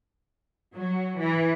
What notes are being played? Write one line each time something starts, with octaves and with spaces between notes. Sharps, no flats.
F#3
E3